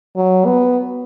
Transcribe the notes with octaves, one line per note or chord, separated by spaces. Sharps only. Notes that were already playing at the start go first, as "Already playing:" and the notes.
F#3
B3